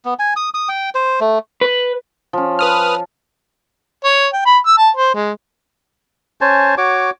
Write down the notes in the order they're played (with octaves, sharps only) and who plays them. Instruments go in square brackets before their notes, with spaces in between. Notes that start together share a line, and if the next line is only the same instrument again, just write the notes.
[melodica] B3
G#5
D#6
D#6
G5
C5
A3
[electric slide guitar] B4
[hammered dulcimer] F3 C#4
[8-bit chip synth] B4 D#6 F6
[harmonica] C#5
G5
B5
E6
A5
C5
G#3
[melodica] C#4 C5 G#5 A5
F#4 C#5 D6